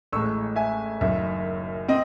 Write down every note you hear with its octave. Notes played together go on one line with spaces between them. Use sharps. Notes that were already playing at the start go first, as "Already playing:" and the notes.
A1 A2 G#3 C#6 E6
E5 G#5
F#1 F#2 D#3 E5
C4 D#5